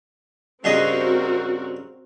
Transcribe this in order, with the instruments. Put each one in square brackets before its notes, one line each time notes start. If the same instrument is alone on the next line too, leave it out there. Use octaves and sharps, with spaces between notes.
[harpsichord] G2 C#3 D#5 [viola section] C4 F#4 A#4